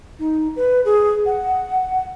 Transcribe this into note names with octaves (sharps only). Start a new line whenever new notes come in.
D#4
B4
G#4
F#5